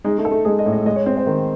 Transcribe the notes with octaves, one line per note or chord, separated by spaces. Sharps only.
G#3 D#4
A3
A4
A3
G#3 G#4
D#5
A2
D#5
G#3 D#5
C#5
C4 C#5
C5
D#3